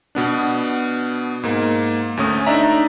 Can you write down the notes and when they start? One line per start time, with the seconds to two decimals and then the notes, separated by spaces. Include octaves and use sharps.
0.15 B2 B3 D4
1.43 G#2 A#3
2.17 D2 A3 C#4 D#6
2.46 D4 D#4 D5 E5 A#5